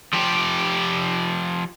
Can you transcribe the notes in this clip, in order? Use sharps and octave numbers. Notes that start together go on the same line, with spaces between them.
F3 G4